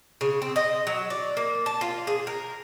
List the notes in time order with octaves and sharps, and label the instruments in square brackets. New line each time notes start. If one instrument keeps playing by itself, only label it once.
[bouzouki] C#3
C4
D#5
F#3
D5
A#3
A5
F4
G#4
A#4